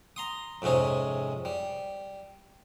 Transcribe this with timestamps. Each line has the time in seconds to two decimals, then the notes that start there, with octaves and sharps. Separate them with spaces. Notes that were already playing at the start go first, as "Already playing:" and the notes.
0.16 A#5 C6 D#6
0.62 F2 G#2 C3 C#4 G#4
1.45 G3